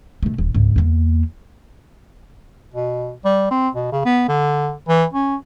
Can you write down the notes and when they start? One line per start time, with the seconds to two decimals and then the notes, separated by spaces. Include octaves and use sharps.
0.23 B2 A3
0.38 D#1
0.55 C#2 G#2
0.76 E2 A#3
2.74 B2
3.25 G3
3.51 C4
3.75 B2
3.92 C#3
4.05 B3
4.28 D3
4.89 E3
5.13 C#4